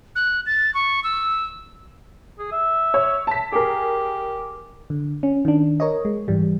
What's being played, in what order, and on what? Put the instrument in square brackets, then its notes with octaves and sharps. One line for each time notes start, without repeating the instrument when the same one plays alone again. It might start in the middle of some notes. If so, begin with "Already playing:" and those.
[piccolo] F#6
A6
C#6
E6
[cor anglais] G#4
E5
[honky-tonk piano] C#5
A5 B6
[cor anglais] G4 [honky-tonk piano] G#4 A#4
[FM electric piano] D3
C#4
D#3 D4
A#4 C#5 D#5
G#3
G#2 E3 G3